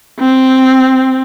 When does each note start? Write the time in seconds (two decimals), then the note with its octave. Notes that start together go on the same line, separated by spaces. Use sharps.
0.20 C4